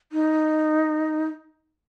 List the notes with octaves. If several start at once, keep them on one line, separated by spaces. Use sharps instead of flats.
D#4